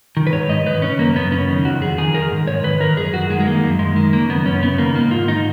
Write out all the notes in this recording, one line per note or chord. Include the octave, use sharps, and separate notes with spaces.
D#3
B4
G#2 C#5
G#2 D#5
D#3 B4
C#3 C#4
F#2 A#3
F#2 B3
C#3 C#4
D#3
F2 F#4
F2 G#4
D#3 G#4
D#3 A#4
G#2
G#2 C#5
D#3 B4
D#3 A#4
F#2 G#4
F#2 F#4
D#3 G#3
G#3
D#3 A#3
F#2
F#2 G#3
D#3
C#3 A#3
F#2 B3
F#2 C#4
C#3 B3
D#3 A#3
G#2 A#3
G#2 F4
D#3 D#4